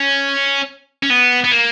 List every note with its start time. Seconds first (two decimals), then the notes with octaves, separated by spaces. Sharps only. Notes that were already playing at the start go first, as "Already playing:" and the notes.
Already playing: C#4
1.03 C#4
1.10 B3
1.44 B3
1.52 A#3